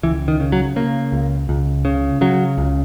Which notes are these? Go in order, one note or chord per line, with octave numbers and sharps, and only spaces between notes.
C#2 E3
D#3
C#3
F#3
C#3 A#3
C#2
C#2
C#3
C#3 F#3
C#2